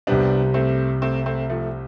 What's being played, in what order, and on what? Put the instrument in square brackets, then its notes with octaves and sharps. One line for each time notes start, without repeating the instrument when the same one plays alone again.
[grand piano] C2 C3 G3 [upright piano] B3 D4
[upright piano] A3 C4
A3 C4
A3 C4
F3 A3